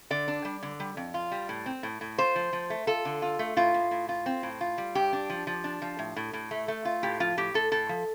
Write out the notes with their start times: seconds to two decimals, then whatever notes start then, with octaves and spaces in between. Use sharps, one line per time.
0.11 D3 D5
0.28 D4
0.45 G3
0.63 D3
0.80 G3
0.97 F2
1.14 F4
1.32 G3
1.49 A2
1.66 C4
1.83 A2
2.01 A2
2.18 F4 C5
2.35 F3
2.53 F3
2.70 A3
2.87 F4 A4
3.05 D3
3.22 F4
3.39 A3
3.57 A2 F4
3.74 A2
3.91 A2
4.09 F4
4.26 C4
4.43 A2
4.61 F4
4.78 G3
4.95 G2 G4
5.13 D4
5.30 F3
5.47 F3
5.64 D4
5.82 F3
5.99 A2
6.16 A2
6.33 A2
6.51 A3
6.68 A3
6.85 F4
7.03 A2 G4
7.20 F3 F4
7.37 A2 G4
7.54 A2 A4
7.72 A2 A4
7.89 F3